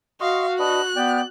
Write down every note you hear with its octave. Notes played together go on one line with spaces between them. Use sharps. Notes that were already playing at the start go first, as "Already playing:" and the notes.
F#4 D#5 F5 C6 C#6
D4 B4 D#5 F#6
B3 D5 G5